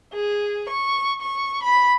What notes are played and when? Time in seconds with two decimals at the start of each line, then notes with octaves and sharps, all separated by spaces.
0.13 G#4
0.69 C#6
1.21 C#6
1.63 B5